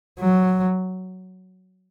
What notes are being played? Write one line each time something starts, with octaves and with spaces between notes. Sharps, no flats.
F#3